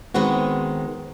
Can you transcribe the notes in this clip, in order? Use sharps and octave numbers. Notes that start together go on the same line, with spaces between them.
D#3 G#3 B3 C4 F#4